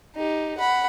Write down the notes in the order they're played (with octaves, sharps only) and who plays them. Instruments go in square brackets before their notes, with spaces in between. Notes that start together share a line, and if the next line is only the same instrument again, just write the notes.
[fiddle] D#4 G4
F#5 B5